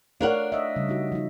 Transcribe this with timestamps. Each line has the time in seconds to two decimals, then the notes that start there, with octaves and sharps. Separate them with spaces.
0.21 A3 D4 A#4 C#5 F5 F#5
0.52 D#5 E5
0.76 C#3 G3
0.89 D#4 F#4
1.12 F3 D#4